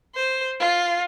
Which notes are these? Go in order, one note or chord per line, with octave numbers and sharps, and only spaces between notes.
C5
F4